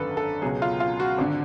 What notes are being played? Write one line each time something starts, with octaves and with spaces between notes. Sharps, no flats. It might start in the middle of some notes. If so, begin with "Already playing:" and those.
Already playing: G#1 F#2 D3 A4 B4
A4
C#2 B2 F#3 G#4
F4
F4
F#4
G#1 D3